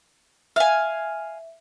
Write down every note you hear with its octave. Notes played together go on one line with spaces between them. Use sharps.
E5 F5 G#5